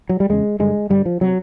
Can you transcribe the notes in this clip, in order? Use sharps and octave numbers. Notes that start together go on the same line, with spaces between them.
F#3
G3
E2 C#3 G#3
G2 D3 G#3
G2 D3 G3
F3
C3 F#3